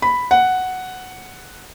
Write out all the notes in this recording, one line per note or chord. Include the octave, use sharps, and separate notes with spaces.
B5
F#5